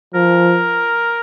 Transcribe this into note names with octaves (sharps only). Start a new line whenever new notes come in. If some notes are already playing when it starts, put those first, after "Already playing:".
F3 A#4